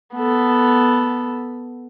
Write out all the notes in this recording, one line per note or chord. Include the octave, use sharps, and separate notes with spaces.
B3 A4